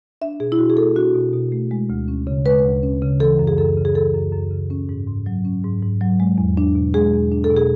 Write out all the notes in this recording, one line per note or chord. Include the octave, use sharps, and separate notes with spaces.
D4 E5
B2 G#4
E4
B2 F#4
G#4
A3 A4
D4 F#4
B2
B2
A3
G#3
D2
C#4
C#3
G#3 B4
D2
C#4
C#3
E3 A4
F#2
G#4
F#2 A4
C#3
G#4
E3 A4
F#2
F#2
C#3
C#4
G#2
G#2
F#3
C#4
G#2
G#2
F#3
G#3
E2
D4
B2
G#3 G#4
E2
D4
A4
B2
G#4